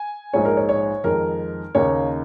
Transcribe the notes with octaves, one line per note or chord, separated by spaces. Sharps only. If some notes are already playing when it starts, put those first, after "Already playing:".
Already playing: G#5
A#1 G#2 F3 G#3 D#4 C#5
A#4
C#5
C#5
F2 D#3 G#3 D#4 A#4
D#2 C#3 A#3 D#4 C#5